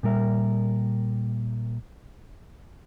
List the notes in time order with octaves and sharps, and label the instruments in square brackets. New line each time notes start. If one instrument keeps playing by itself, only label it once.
[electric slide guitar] A#2 G3 A#4 E5